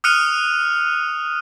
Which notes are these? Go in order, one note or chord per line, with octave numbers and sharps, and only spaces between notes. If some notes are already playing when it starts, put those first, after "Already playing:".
D#6 F6 F#6 C#7 D#7 F7